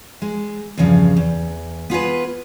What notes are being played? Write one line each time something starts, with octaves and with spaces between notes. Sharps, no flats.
G#3
E2 G2 C#3 F3
E2
B3 F4 G#4 B4